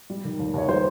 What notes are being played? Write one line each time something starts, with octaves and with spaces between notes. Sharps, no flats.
G3
D#3
D#2
D#2 C#5
G3 C5